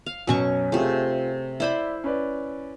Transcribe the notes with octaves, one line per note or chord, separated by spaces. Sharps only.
F5
F#2 B2 F#3 C#4 C#6
C3 A3 F4 G#4
E4 C5 D5 E5 B5
C#4 B4 D5